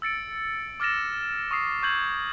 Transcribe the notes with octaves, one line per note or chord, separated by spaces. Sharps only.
E6 A6 C#7 D7
D6 F6 A6 A#6 E7
C#6 D#6 C7
C#6 G6 G#6 F#7